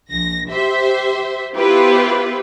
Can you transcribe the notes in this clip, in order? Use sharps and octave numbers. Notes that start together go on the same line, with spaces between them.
A#1 A#6
G4 C5 E5
B3 E4 F4 G4 B4 C5